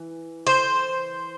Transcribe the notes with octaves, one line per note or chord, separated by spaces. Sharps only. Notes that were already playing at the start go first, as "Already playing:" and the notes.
Already playing: E3
C5